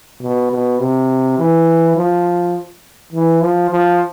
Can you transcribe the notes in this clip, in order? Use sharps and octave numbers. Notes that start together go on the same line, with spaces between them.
B2
B2
C3
E3
F3
E3
F3
F3